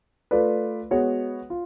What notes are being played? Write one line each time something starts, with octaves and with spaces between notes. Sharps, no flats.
A3 F4 B4 D5
G#3 B3 F#4 C#5
F4